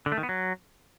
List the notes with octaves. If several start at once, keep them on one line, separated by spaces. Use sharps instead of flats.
D3
A3
D#3
B3
F#3